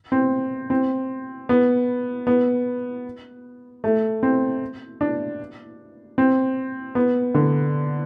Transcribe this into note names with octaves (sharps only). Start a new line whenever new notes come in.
C4
C4
B3
B3
A3
C4
D4
C4
B3
D3